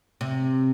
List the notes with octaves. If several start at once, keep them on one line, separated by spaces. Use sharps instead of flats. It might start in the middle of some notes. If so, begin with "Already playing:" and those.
C3